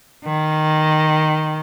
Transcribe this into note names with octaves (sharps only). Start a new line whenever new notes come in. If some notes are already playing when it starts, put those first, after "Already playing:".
D#3